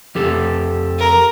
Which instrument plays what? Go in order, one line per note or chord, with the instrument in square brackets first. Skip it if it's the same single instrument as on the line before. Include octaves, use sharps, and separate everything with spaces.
[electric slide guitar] F2 G4 A4
[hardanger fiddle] A#4